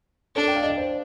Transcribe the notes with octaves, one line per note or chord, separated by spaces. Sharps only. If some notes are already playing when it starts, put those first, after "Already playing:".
D4 A4
G5
F5
D#5
D5
C5